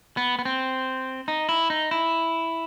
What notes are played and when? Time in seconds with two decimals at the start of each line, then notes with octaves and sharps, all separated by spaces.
0.17 B3
0.39 B3
0.45 C4
1.28 D#4
1.49 E4
1.70 D#4
1.91 E4